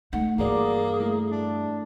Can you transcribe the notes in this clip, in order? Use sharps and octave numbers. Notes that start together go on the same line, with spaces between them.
A3 D#4 F#5
G2 E3 A#3 F#4 G#4 D5
A3 E4
D4